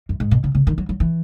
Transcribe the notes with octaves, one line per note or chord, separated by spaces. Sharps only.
F#2
G#2
B2
C#3
C#3
D#3
F#3
F#3
E3